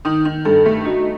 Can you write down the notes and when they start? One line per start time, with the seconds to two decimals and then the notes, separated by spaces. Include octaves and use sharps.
0.05 D#3 D#4
0.25 D#3
0.45 G2 A4
0.66 A3
0.85 D#4 F#4